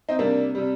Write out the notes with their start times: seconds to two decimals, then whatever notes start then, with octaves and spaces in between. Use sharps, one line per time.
0.09 C4 D#4
0.19 C3 G3 A#3 D4
0.55 C3 G3